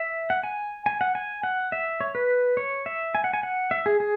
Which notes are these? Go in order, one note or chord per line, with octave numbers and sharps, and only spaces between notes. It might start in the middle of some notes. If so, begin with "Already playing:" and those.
Already playing: E5
F#5
G#5
G#5
F#5
G#5
F#5
E5
C#5
B4
C#5
E5
G#5
F#5
G#5
F#5
E5
G#4
G#4